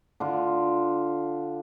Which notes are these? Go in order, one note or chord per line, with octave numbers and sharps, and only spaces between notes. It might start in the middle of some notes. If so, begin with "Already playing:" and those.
D3 F4